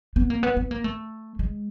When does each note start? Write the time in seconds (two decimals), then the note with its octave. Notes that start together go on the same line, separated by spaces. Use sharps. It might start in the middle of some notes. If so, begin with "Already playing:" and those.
0.16 B3
0.30 A#3
0.43 B3
0.57 B3
0.71 A#3
0.84 A3
1.39 G#3